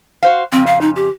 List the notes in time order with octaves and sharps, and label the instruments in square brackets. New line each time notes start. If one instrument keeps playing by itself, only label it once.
[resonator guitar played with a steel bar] F#4 C5 F5
[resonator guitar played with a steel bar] F2 C#3 [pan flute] C4
[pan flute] F5
D#4
G4